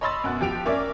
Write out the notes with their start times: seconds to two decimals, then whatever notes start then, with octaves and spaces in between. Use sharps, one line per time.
0.01 C#5 D#5 B5 C6 E6 A6
0.24 F#2 B2 F#5 F#6
0.41 F3 G4 D7 F7
0.65 A#3 C#4 A#4 D5 E5 D6